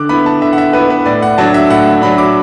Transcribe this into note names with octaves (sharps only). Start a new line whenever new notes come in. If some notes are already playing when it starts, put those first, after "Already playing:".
Already playing: D3 D6 F#6
B3 E4 B5
A5
D3 E5
F#5
E5
B3 E4 B4
B4
A2 D5
F#5
F#3 D4 A5
E5
A2 F#5
F#3 D4 B5
D6